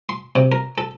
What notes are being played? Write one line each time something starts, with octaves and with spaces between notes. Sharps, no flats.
C6
C3
A#4
A4